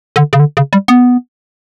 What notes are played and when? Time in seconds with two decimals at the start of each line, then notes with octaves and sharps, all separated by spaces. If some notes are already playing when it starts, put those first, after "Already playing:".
0.16 D3
0.33 C#3
0.40 D3
0.57 C#3
0.73 G3
0.88 B3